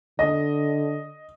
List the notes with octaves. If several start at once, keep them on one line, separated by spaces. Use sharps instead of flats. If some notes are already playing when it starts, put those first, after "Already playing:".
D3 D#5